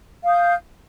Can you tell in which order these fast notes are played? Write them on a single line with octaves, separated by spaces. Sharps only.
F5 D#6 G6